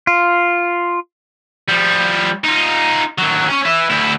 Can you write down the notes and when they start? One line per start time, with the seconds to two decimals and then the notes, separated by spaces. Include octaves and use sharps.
0.07 F4
1.68 F3 G3
2.44 D#4 F4
3.19 D#2 F#3
3.50 C#4
3.65 B4 E5
3.90 D2 E4